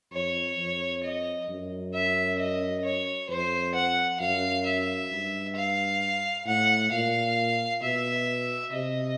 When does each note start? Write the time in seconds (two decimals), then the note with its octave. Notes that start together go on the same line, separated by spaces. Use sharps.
0.12 F2 C#5
0.58 F2
1.04 D#5
1.49 F#2
1.94 E5
2.39 D#5
2.84 C#5
3.29 F2 C5
3.75 F#5
4.20 F#2 F5
4.65 E5
5.11 G2
5.56 F5
6.46 A2 F#5
6.91 A#2 F5
7.82 B2 E5
8.72 C3 D#5